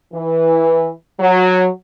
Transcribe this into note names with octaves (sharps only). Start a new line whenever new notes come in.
E3
F#3